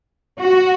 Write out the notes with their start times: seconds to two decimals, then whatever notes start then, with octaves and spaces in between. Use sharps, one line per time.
0.39 F#4